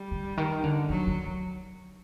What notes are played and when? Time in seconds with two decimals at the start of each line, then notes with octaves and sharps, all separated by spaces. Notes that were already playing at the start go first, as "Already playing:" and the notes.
Already playing: G3
0.11 D3
0.37 D#3
0.64 D3
0.90 D3 F#3
1.07 D3